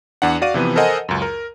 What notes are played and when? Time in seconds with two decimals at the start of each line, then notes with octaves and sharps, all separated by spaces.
0.22 E2 D4 F#5
0.42 F#4 D5 F5 D#7
0.54 C3 E3 F3 B3
0.76 A4 A#4 C5 D#5 F#5 G#5
1.09 C#2 F#2
1.22 A#4